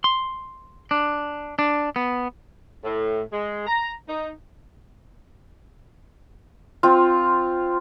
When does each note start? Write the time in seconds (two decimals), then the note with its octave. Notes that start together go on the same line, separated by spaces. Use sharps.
0.04 C6
0.91 D4
1.59 D4
1.96 B3
2.84 A2
3.32 G#3
3.67 A#5
4.08 D#4
6.83 C4 F4